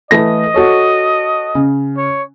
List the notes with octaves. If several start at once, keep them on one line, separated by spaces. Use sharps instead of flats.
E3 A3 D#5 A#6
F#4 A4 C#5
C#3
C#5